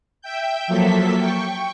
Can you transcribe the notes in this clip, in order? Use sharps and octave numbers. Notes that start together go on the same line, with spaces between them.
E5 G5 G6
F3 F#3 A#3 A4 E5 B6
G5 C#6